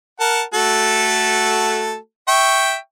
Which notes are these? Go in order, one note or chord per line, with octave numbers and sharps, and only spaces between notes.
A#4 F#5 A5
A3 F#4 A4
E5 G5 C#6